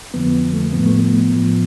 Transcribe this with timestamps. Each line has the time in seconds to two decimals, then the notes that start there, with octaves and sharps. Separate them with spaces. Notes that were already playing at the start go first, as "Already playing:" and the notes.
0.14 F2 D3 F3 B3
0.54 A3
0.73 A2 F3 B3
0.86 A3
0.99 B3
1.34 A2 F3